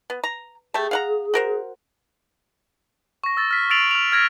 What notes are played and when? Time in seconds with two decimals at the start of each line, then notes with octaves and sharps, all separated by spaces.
0.10 B3
0.24 A#5
0.74 A3 G4 G#4 A5
0.91 F5 F#5 A#5
1.34 F#4 A#4 C5
3.24 C#6 A#6
3.37 E6 A6
3.51 F6 B6
3.70 E6 A6 C7 D7 F7 F#7
3.91 F6 F7
4.12 F6 G#6 A#6 D7